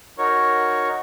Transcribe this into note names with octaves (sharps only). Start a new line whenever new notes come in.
D#4 F#4 A#4 C#5 C#6